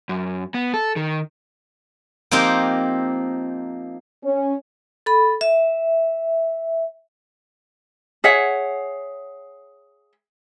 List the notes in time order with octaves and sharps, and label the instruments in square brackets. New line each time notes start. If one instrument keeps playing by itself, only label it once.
[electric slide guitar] F#2
B3
A4
D#3
[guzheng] F3 A#3 C4 D#4 G4 A#4
[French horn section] C#4
[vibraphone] A4 B5
E5
[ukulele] G#4 C#5 E5 F#5